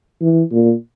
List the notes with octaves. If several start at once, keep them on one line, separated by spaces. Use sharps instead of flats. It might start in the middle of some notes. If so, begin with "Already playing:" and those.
E3
A#2